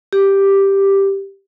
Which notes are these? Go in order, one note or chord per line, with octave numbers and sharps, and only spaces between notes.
G4